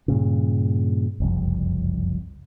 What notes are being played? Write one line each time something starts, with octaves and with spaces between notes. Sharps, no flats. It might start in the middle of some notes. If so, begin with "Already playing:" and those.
G2 A#2 C#3
F#1 C2 F2